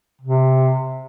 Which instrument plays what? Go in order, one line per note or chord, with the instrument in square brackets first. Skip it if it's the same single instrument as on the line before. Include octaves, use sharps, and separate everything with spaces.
[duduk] C3